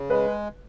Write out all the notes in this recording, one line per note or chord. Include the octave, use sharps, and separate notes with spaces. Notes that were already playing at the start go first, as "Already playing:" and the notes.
Already playing: C#3
G#3 B4